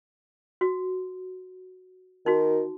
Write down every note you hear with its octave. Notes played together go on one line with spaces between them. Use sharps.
F#4
D#3 D#4 F#4